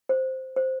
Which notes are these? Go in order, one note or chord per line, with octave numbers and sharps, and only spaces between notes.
C5
C5